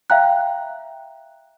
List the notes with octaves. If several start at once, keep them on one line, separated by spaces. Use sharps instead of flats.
E5 F5 G5 A#5 F#6